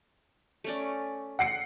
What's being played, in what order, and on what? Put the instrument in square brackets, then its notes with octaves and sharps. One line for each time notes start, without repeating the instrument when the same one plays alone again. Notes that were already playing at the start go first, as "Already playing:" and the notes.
[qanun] A3 C#4 D5
[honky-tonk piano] F#5 C7 C#7